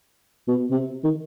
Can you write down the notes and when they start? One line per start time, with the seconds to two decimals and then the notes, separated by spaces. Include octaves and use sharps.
0.48 B2
0.71 C3
1.04 D#3